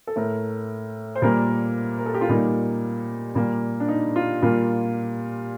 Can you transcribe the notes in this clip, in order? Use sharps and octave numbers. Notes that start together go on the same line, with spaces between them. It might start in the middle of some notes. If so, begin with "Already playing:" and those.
A4
A2 A3 A#4
C5
A#2 G3 A#3 A#4
A#4
A4
G4
F4
A#2 G3 A#3 D#4
A#2 G3 A#3
D4
D#4
F4
A#2 G3 A#3 F4